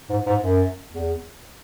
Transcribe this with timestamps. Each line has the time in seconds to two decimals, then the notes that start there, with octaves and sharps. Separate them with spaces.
0.09 G#2
0.26 G#2
0.43 F#2
0.93 E2